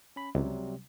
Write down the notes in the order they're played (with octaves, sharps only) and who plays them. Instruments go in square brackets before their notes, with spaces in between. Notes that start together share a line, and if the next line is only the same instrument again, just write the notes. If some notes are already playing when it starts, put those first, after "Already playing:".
[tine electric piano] C#4 B5
[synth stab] C#2 [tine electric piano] C3 F#3 G3